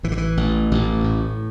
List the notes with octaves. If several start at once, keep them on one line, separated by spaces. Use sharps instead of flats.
A1 E3
D3
E3
A1
A1
A2